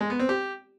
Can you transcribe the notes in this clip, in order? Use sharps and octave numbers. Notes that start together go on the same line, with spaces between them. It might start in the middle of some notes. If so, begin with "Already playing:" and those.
G#3
B3
C4
G4